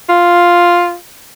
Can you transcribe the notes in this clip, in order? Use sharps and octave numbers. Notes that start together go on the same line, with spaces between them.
F4